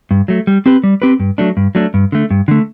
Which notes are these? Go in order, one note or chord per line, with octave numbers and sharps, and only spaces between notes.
G2
F#3 A3
G3
C4 G4 B4
G3
C4 G4 B4
G2
F#3 A3 D4
G2
F#3 A3 D4
G2
D3 A3
G2
D3 A3